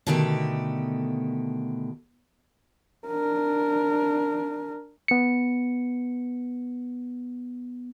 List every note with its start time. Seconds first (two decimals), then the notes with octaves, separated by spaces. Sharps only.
0.07 B2 D3 D#3 A3 G4
3.08 D4 A#4
5.08 B3 C#7